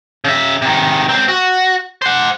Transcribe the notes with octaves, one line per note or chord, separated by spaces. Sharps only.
C#3 E5
C3 D#3
C#2 C4
F#4
C5 F#5